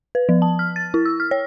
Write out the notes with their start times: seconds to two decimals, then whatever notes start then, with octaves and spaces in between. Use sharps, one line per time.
0.15 B4
0.29 F3
0.42 A5
0.59 F6
0.76 A6
0.94 E4
1.05 E6
1.20 F6
1.31 C#5